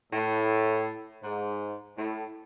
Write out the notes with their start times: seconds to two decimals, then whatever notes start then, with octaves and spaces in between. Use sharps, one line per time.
0.12 A2
1.23 G#2
1.97 A2